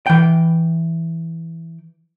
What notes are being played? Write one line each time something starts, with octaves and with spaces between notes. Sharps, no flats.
E3 G5